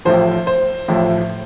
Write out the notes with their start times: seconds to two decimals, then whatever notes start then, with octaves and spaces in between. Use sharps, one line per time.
0.05 A1 A2 F3 C5
0.47 C5
0.88 A1 A2 F3